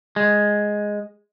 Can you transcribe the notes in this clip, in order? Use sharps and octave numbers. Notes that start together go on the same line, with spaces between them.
G#3